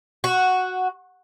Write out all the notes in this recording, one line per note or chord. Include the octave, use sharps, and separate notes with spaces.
F#4